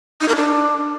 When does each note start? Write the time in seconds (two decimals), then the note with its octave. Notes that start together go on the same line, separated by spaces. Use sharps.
0.21 D#4
0.28 A#4
0.36 D4